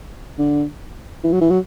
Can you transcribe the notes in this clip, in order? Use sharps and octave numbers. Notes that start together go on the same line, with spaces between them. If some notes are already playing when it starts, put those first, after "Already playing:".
D3
E3
F#3
E3
F#3